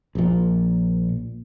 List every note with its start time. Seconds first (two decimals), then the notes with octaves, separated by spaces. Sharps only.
0.15 A#1 A#2